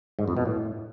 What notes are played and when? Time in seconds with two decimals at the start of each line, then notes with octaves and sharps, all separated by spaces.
0.19 G#2
0.28 F2
0.37 B2
0.46 A2